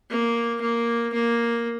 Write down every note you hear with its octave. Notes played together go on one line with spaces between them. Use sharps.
A#3
A#3
A#3